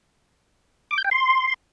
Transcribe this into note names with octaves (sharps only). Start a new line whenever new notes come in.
D6
G6
G5
C6